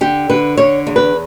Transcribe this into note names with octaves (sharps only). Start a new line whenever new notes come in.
D3 G4
D3 B4
D3 C#5
E2
B4